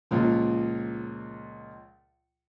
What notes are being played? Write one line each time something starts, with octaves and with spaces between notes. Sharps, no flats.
C#2 A#2 F3